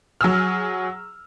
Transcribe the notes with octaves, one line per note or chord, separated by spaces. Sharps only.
F#3 G#4 E6 F6